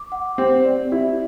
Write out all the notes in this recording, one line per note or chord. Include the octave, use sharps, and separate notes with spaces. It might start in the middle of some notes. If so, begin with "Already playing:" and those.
Already playing: D6
F#5
C4 G4
D5
E4 G4